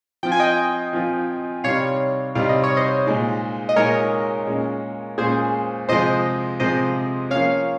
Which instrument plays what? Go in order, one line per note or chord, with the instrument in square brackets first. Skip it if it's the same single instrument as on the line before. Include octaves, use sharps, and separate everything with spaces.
[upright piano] F3 C4 F4 [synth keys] G5
[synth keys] G#5
D#5 G5
[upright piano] F3 C4 F4
[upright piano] C3 G3 C4 D#4 [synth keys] C#5 F5
[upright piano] C3 G3 C4 D#4 [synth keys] F5
[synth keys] D#5
C#5
C5 D#5
[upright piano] A#2 G#3 D#4
[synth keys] D#5
[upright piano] A#2 G#3 D#4 [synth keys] A#4 C#5
[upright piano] A#2 G#3 C#4
[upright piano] A#2 G#3 C#4 [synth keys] G#4 C5
[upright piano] C3 F3 G#3 [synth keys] C5 D#5
[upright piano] C3 F3 G#3 [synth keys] C5 D#5
[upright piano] F3 A#3 C#4 [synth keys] C#5 F5